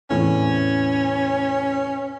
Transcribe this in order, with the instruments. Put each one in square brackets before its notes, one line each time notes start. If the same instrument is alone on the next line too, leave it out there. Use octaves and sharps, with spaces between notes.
[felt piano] E2 A2 C3 [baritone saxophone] C#4